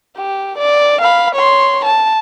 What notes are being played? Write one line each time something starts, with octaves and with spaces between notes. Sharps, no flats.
G4
D5
F5 B5
C#5 C6
A5